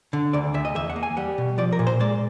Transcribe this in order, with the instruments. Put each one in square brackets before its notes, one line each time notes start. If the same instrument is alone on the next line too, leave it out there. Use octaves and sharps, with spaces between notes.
[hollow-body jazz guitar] D3
D2 D5
D2 E5
D#5
E2 E5
F#5
A#3
G#5
G3 F#5
B2
F3 D5
A#4
A#2
C5
G#3 D5